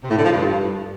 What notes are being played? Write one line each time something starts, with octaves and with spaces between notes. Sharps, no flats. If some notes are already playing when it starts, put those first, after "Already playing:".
C3
A2
D3
F3
G2